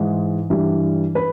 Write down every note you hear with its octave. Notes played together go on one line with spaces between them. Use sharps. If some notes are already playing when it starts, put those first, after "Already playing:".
Already playing: G#2 E3 G#3
G2 E3 G3
B4